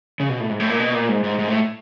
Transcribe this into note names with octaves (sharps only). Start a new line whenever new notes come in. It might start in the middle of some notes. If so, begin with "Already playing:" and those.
C#3
B2
A2
G#2
A2
A#2
B2
A#2
G#2
G#2
G#2
A2